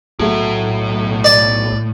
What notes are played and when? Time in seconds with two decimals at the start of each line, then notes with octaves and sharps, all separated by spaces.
0.19 B1 A2 F#3 A3
1.24 D5